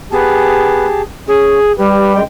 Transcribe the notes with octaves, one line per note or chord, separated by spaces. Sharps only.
B3 G4 G#4 A5
C#4 G#4
G3 G4 B4
F#2 G#3 G5